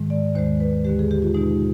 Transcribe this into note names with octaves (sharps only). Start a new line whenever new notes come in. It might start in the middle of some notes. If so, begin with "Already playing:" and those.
Already playing: G#2 D#3 G#3
D5
D#2 D#3 G#3 C5
B4
D#2 D3 G#3 G4
G#4
G4
F4
B2 G#3 D#4